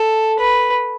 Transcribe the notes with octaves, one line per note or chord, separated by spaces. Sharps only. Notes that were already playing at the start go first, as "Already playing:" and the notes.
Already playing: A4
B4